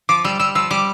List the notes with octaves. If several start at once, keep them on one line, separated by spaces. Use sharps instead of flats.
F3 D6
G3 E6
G3 E6
F3 E6
G3 D6